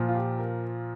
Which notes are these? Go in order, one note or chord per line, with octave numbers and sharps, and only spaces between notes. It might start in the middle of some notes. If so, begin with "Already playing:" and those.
Already playing: A#2 F3
F4
G4
A#4